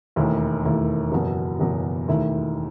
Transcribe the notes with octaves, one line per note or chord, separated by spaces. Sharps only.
E1 D#2 D#3 A3 E4
E1 D#2 D#3 A3 E4
F#1 E2 B2 F#3
F#1 E2 B2 F#3
E1 D#2 D#3 A3 E4